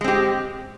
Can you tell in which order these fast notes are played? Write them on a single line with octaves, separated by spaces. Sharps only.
G#3 C4 G4